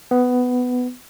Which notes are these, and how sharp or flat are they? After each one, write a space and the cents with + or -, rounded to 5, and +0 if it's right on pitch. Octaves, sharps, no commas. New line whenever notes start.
B3 +10